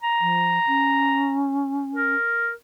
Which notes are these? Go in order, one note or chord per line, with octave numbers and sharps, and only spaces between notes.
A#5
F3
C#4
A#4